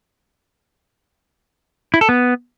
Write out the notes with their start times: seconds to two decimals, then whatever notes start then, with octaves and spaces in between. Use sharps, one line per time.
1.94 E4
2.01 A4
2.09 B3